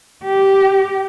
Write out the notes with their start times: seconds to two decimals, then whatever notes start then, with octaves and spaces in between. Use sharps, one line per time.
0.24 G4